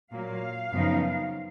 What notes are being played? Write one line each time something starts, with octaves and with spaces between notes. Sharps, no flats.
A#2 F#3 A#3 F5
F#2 C#3 F3 B3 D#4